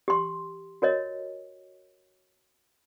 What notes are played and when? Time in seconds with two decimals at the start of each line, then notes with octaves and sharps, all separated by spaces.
0.08 G4 C6
0.82 F#4 A#4 C#5 D#5